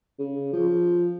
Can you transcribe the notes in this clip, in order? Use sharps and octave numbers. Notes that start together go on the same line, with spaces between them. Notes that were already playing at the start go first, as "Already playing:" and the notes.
C#3
F3